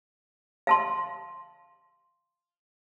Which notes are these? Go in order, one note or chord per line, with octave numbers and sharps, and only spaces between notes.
F5 A5 C6